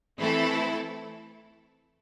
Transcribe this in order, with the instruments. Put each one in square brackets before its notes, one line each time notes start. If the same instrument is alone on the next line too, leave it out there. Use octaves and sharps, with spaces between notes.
[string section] E3 A3 C4 E4 A4